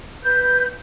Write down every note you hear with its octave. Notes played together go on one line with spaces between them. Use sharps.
B4 G6